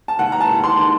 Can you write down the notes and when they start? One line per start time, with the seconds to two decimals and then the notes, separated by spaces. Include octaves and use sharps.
0.08 A5
0.19 D#2 F#5
0.32 A#5
0.40 A5
0.49 D#2
0.64 C6
0.78 D#3